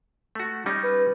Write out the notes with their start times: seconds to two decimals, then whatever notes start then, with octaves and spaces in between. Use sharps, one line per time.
0.35 A3 F#4
0.66 G3 C#4 D#4
0.84 B4